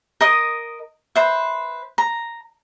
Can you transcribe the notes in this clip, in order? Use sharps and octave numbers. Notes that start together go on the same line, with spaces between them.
A#4 D#5 D#6
B4 C5 E5
A#5